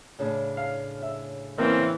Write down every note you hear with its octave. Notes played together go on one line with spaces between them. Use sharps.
A2 C#3 D4
F5
E5
E3 A#3 C4 C#4